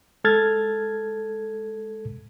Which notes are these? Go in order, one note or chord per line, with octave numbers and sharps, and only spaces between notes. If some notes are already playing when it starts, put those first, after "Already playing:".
G#3 A4 F6 G#6 A6